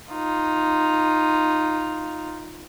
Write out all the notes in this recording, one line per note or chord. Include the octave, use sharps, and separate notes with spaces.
D#4 F4